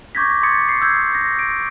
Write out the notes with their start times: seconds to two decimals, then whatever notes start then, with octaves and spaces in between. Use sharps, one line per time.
0.15 C#6 D6 G6 G#6 A#6 B6
0.43 C6 D#6 G#6 A6 C#7
0.69 C7
0.81 E6 G6 G#6
1.15 A#6
1.39 D7